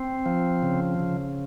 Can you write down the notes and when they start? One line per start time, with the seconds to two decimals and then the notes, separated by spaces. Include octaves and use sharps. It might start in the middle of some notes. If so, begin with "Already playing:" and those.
Already playing: C4
0.26 F3
0.63 C#3
1.00 C#3